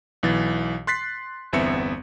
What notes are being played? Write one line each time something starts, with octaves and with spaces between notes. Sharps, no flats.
B1 E3 A6
C6 F#6 A6 B6 C7
G1 E2 B3 C4 E5 C#7